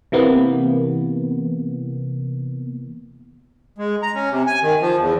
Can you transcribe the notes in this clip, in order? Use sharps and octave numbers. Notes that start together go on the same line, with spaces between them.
C3 E3 A#3 B3
G#3
A#5
C#4
C3
G#5
D#3
F3
E2